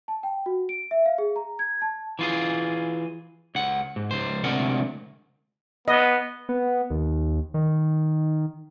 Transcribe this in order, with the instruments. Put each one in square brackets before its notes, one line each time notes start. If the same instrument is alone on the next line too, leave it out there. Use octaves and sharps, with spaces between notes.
[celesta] A5
G5
F#4
D7
E5
F5
G#4
A#5
G#6
A5
[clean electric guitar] E3 F4 G#4
C#2 F#5
G#2
C#2 C5
D2 C3 G#3 A#4 D5 F#5
[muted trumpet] B3 [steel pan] D#5
[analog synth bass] B3
D#2
D#3